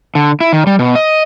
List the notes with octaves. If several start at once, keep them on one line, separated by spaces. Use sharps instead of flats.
D3
E4
D#3
G3
B2
D#5